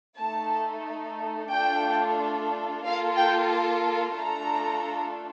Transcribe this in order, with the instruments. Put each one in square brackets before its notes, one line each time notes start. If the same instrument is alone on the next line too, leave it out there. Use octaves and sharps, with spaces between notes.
[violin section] A3 D#4 A4 A5
A3 D4 F4 A4 G5
A#3 F4 A4 F5
G5
A5
A3 D4 F4 A4 A#5